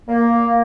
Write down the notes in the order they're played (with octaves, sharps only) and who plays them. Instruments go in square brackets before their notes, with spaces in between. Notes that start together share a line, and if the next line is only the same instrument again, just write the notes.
[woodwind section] A#3